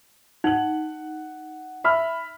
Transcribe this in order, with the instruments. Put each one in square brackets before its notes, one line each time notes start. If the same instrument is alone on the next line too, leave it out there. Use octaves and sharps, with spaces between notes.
[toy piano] D#4 [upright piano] F#5 F#7
[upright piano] E5 B5 F6